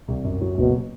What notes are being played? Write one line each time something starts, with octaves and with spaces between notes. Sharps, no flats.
C2
F#2
F#3
F#1 B2